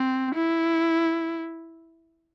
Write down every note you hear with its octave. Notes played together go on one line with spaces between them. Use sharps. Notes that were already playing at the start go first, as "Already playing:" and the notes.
Already playing: C4
E4